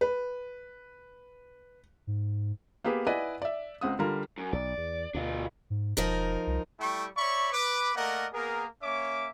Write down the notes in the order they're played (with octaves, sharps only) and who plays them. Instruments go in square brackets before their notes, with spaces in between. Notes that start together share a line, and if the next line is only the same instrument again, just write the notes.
[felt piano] B4
[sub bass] G#2
[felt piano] A#3 B3 G4 G#4 B4
E4 B4 D5 D#5 F#5 G#5
D5 E5
C#2 C4 F#5 D#6
D3 G3 F4 A#4
[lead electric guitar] F#2
[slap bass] B1 [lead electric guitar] D5
[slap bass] E2
[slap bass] D2 B2 [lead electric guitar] D4 F4
[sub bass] G#2
[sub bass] E1 [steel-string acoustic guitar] F3 D#4 A#4
[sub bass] C2
[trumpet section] G3 A3 E4 G5 C#6
C#5 D5 E5 B5 C#6
B4 D6
A3 A#3 A#4 D5 D#5 F#5
A#3 B3 G#4 A#4
A#3 C#4 C#5 E5 D6